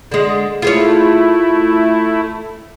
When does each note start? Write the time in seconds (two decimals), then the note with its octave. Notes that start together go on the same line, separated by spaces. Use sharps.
0.11 D3 G#3
0.62 A3 E4 F4 G#4 C#5